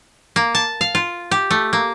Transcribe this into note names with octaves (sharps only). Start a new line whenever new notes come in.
A#3
A5
F5
F4
G4
A3
A#3